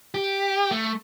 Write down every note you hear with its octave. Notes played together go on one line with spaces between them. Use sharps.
G4
A3